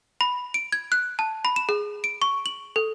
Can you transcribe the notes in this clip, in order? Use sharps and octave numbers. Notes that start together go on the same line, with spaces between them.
B5
D7
G#6
F#6
A5
B5
E7
G#4
D7
C#6
F#7
A4